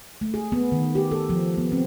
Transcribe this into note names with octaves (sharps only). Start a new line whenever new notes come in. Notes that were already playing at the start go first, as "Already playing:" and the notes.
A3
G#4
B3
D#3
G4
A4
F3
B3
C4